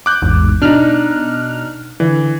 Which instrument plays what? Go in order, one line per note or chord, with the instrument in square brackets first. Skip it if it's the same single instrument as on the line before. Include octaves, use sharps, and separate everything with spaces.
[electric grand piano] D6 F#6 G6
[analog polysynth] A1 E2 G#2
[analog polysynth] B2 F6 F#6 [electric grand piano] D4 D#4
[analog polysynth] D3 [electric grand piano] E3